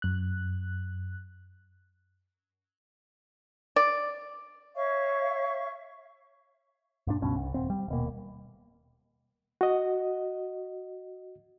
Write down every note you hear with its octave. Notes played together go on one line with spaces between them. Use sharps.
F#2 F#6
D5
C#5 E5 F5 C#6
G2 A#2 D4
C#2 G2 B2 C#4
C2
D#1 C4
G3
D#1 B2 A#3
F#4 D#5